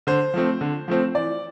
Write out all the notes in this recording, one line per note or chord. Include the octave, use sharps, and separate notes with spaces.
D3 C5
F3 A3 C4
D3
F3 A3 C4
E3 D5